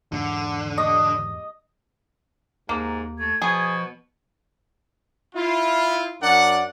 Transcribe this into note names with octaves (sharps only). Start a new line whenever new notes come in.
E2 G#2 D3
D#5
D#2 G#2 A#3
A3 G#6
B2 F3 G#4
E4 F4
F#2 D4 A#4 D5 F#5